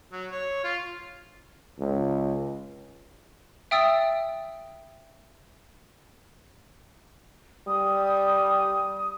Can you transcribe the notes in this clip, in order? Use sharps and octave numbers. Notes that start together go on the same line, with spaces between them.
F#3
C#5
F4
C#2
E5 G5 D#6 E6 A6
G3 D#6